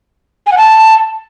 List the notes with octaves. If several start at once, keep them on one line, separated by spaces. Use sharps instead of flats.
G#5
F#5
A5